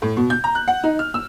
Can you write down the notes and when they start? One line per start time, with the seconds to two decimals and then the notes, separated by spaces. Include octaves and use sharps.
0.02 A2
0.17 B2
0.30 G6
0.44 A#5
0.55 F#6
0.68 F#5
0.84 D#4
0.99 F6
1.14 E6